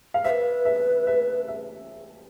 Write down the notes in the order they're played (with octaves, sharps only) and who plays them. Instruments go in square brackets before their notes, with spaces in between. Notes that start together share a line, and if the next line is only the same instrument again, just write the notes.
[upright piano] F5
[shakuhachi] C5 [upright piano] E5
[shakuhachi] B4
[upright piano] E5
E5
E5